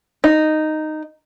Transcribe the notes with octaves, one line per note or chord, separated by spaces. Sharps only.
D#4